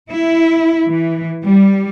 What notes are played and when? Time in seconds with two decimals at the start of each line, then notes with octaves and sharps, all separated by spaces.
0.10 E4
0.87 E3
1.44 G3